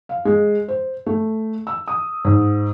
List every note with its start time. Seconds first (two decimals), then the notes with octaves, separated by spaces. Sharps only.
0.09 F5
0.25 G#3
0.68 C5
1.06 A3
1.67 E6
1.88 D#6
2.25 G#2